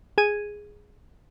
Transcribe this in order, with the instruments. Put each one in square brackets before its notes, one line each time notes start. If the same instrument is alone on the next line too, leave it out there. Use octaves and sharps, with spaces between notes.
[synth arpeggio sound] G#4 G#6 D#7